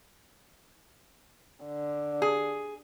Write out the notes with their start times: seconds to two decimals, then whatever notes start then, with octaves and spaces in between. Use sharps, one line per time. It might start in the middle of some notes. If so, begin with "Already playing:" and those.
1.65 D3
2.22 G#4